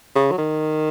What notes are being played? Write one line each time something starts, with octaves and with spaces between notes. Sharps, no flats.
C#3
F#3
D#3